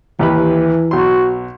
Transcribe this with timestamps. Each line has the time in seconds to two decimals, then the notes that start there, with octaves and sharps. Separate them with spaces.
0.19 D#2 E3 G4 B4
0.91 B1 F#4 C6